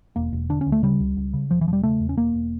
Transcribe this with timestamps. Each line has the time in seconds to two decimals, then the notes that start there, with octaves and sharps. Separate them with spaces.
0.16 E1 A#3
0.33 E1
0.50 D3 D4
0.61 C#4
0.67 D2
0.72 A3
0.83 C#3 G3
1.00 C#2
1.17 C#2
1.33 C#3
1.50 E1 F3
1.61 E3
1.67 E1 F3
1.73 G3
1.83 C#3 A3
2.00 E2
2.09 C#4
2.17 E1 A#3
2.34 E1